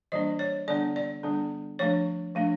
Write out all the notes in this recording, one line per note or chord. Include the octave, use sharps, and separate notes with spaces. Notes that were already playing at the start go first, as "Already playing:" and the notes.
E3 G3 A#3 D4 D#5
C#5
D3 G3 B3 D4 D5
D5
D3 G3 B3 D4
F3 A3 D4 C#5
F3 A3 D4